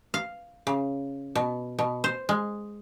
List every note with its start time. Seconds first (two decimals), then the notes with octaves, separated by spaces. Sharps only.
0.14 F5
0.67 C#3
1.35 B2
1.79 B2
2.04 C5
2.29 G#3